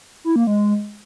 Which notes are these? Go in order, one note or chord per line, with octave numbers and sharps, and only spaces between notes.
E4
A#3
G#3